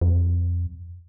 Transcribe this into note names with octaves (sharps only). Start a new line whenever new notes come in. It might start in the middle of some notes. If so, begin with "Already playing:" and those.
F2